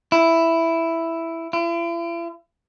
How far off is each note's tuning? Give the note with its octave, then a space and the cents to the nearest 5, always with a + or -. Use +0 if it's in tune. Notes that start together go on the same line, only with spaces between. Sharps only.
E4 +5
E4 +45